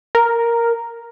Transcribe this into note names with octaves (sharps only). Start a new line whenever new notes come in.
A#4